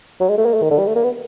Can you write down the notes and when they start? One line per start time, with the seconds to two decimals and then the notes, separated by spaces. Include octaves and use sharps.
0.20 F#3
0.29 G#3
0.37 A3
0.46 A#3
0.54 A3
0.62 D#3
0.71 D3
0.79 G3
0.87 A3
0.95 A#3
1.04 B3